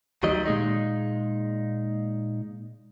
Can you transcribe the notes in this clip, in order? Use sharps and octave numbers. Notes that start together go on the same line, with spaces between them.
D2 D#3 F#3 G3 D#5
A#2 G#3 D#4